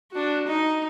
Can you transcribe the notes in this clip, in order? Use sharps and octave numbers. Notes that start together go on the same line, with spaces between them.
D4 F#4
D#4